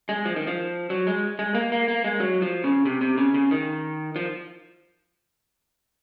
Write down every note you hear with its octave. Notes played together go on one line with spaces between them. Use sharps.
G#3
F3
D#3
F3
F#3
G#3
G#3
A#3
A#3
A#3
G#3
F#3
F3
C#3
C3
C3
C#3
C#3
D#3
F3